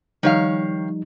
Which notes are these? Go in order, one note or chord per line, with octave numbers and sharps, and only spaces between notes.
D#3 F3 G3 D#4 C#5 F5